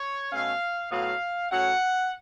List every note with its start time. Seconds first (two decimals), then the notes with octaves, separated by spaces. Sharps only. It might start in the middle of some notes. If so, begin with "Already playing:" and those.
Already playing: C#5
0.32 B2 A3 C#4 F5
0.91 A2 F#3 B3 F5
1.50 A2 F#3 C#4 F#5